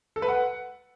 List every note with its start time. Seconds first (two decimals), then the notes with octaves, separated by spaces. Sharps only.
0.16 A4
0.22 B4
0.29 F#5